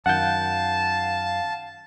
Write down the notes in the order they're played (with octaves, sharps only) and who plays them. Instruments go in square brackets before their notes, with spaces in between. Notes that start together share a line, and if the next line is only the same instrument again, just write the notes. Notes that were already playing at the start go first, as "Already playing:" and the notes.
[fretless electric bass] F#2 D#3 [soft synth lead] F5 [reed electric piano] F#5 G6 [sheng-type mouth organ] A5